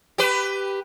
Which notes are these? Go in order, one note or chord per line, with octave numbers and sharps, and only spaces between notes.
G4 B4